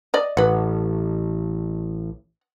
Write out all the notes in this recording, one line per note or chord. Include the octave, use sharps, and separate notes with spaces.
D5 D#5
A1 B4 F#5